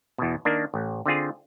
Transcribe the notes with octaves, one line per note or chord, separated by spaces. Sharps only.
E2 B2
D#3 A#3 D4
A1
D3 C4 F4 G#4